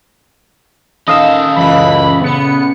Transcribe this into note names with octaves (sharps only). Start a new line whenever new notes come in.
D#3 C#4 A4 D#5 F5 E6
C#2 F#2 E3 B5
C#3 B3 C#7